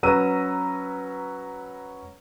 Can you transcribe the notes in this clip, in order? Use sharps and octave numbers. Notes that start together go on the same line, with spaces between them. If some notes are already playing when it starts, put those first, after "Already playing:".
F#3 C#4 B4 A#5 E6 D#7